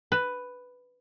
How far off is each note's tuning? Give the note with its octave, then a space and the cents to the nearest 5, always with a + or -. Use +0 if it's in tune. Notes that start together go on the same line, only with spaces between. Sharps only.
B4 +5